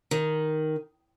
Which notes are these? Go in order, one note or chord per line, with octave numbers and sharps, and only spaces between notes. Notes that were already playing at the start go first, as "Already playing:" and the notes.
D#3